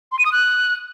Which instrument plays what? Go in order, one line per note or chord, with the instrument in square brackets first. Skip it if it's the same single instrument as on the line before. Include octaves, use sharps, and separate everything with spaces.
[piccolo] C6
D#7
D#6
F#6